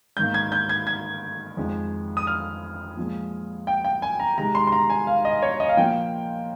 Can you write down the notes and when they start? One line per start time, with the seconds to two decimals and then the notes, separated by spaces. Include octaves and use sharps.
0.17 G#2 D#3 A#3 G6
0.34 G#6
0.52 G6
0.69 G#6
0.87 G#6
1.57 F2 D#3 G#3
2.17 D#6
2.27 F6
2.97 A#2 F3 G#3
3.67 G5
3.84 G5
4.02 G#5
4.20 A#5
4.37 C3 D#3 G#3 A#5
4.55 C6
4.67 C6
4.72 A#5
4.90 G#5
5.07 F5
5.25 D#5
5.42 C#5
5.60 D#5
5.69 F5
5.77 A#2 F3 A#3 G5